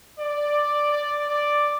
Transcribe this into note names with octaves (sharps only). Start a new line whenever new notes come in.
D5
D5
D5